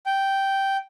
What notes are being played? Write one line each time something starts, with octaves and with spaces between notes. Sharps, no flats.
G5